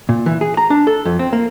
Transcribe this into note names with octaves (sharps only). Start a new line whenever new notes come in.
A#2
E3
G#4
A#5
D4
A4
F2
C4
A#3